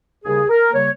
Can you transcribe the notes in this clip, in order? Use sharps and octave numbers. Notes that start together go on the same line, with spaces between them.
D#2 C#3 G3 A#3 G#4
A#4
C#3 G3 A#3 C#5